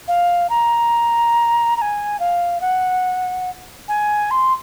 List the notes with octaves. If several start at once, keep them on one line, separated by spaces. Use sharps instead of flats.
F5
A#5
A#5
G#5
F5
F#5
G#5
C6